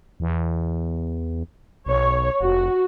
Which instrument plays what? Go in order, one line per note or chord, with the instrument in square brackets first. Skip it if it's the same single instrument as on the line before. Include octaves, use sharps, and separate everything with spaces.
[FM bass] E2
[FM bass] B1 [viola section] C#5
[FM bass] F1 [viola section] F#4